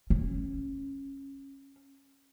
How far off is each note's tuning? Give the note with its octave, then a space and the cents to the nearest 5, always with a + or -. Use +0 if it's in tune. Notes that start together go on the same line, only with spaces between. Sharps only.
C#4 -15